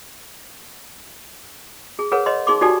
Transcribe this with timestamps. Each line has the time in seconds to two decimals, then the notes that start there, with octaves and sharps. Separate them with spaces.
1.99 G#4
2.12 G#4 A#4 B4 C#5 F#5
2.26 B4 C#5 D#5 C6
2.47 D#4 G#4 C6 D6
2.61 D#4 F#4 G4 A4 D5 G#5